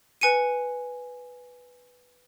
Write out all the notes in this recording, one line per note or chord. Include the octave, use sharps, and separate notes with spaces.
B4 G#5 C#7 D#7